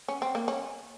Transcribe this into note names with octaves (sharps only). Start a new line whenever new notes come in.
C#4
C4
A#3
C#4